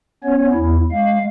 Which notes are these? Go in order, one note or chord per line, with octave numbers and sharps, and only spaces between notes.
B3 C#4 C#5
E2 E4
G#3 F5